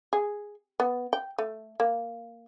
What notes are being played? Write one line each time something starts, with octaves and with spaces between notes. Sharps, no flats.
G#4
B3
G5
A3
A#3